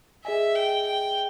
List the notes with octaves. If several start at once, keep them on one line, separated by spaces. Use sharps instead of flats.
G#4 D#5 E5 G#5
G5
G5